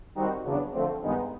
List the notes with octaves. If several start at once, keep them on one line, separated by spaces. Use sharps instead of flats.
D#3 G3 C4 D#4 F#4
E2 C#3 F#3 B3 D4
D3 F3 A3 C4
G2 D#3 G#3 B3 D#4